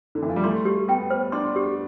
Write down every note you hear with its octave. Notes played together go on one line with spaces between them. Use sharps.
D3
E3
F3
G3
A3 C6
G4
B3 G5
C5
D4 C6
G4